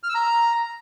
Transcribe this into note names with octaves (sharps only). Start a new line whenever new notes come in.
F6
E6
A#5